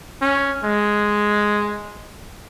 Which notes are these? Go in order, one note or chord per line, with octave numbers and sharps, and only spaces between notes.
C#4
G#3